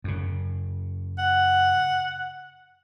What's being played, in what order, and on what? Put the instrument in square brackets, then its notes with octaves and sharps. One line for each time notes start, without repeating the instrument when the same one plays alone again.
[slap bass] F#2 C#3
[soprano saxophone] F#5